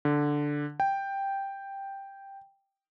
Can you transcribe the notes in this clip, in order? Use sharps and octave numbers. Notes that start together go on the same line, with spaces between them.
D3
G5